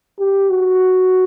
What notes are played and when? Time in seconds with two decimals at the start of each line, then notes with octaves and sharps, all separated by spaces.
0.19 G4
0.49 F#4